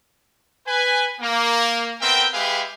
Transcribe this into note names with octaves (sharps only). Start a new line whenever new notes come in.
B4 G#5
A#3
B3 C4 A#4 E5 G5
G#3 G4 G#4 B4 E5 F5